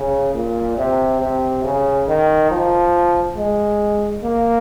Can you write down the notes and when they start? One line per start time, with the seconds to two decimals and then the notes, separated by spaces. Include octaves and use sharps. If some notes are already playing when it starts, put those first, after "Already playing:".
Already playing: C#3
0.34 A#2
0.78 C3
1.21 C3
1.64 C#3
2.08 D#3
2.51 F3
3.37 G#3
4.23 A#3